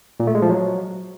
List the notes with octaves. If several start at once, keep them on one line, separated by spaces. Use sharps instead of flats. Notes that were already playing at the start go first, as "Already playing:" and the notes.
A#2
A3
G#3
F3
F#3